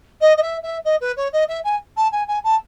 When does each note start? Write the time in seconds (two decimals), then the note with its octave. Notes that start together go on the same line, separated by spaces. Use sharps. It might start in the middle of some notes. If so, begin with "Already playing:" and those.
0.21 D#5
0.37 D#5
0.42 E5
0.62 E5
0.84 D#5
1.01 B4
1.16 C#5
1.32 D#5
1.48 E5
1.64 G#5
1.96 A5
2.12 G#5
2.28 G#5
2.44 A5